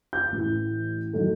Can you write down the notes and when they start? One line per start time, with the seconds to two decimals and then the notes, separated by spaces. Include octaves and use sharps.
0.13 G6
0.32 A1 A2 E3
1.13 D#3 F#3 A3